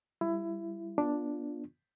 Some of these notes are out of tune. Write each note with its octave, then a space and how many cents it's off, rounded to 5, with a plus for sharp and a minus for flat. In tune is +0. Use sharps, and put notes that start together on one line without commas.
G3 +0 E4 +20
B3 -25 D4 +0 F4 +5